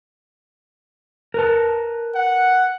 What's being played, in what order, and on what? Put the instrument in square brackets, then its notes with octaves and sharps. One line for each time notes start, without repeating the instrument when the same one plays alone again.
[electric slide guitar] A#4 B4 A5
[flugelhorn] F#5